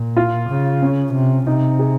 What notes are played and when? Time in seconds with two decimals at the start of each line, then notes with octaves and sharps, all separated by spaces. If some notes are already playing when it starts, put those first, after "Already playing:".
Already playing: A#2
0.17 F4
0.49 C#3
0.82 C#4
1.14 C3
1.47 C3 D#4
1.79 G#4